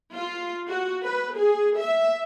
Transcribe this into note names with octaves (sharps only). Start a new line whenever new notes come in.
F4
F#4
B4
G#4
E5